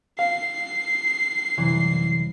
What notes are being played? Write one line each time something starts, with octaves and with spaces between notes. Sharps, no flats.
F5 C7
C2 F#2 E3